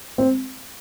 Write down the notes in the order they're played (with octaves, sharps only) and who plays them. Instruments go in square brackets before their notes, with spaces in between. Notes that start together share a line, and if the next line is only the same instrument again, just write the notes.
[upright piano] C4